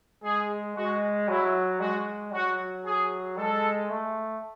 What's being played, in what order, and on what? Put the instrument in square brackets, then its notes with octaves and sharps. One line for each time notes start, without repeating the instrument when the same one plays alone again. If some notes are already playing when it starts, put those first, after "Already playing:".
[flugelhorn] G#3 [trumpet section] G#4
[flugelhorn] G#3 [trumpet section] F#4
[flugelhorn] F#3 [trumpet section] E4
[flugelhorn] G#3 [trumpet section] F#4
[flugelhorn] F#3 [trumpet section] F#4
[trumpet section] G#4
[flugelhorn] G#3 [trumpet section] A4
[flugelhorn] A3